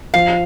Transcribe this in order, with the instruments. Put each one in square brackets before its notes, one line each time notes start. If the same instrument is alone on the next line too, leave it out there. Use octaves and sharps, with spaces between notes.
[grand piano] F3 [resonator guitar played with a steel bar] F5